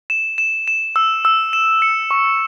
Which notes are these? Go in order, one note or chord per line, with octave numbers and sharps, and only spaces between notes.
E7
E7
E7
E6
E6
E7
C#7
C#6